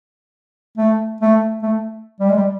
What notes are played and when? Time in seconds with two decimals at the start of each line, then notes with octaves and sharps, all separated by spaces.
0.78 A3
1.21 A3
1.62 A3
2.20 G3
2.29 G#3
2.36 G3